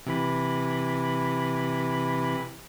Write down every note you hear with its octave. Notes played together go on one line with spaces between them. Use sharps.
C3 E3 B5